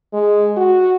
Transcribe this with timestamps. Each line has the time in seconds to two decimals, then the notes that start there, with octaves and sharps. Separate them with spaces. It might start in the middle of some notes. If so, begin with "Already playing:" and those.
0.13 G#3
0.57 F#4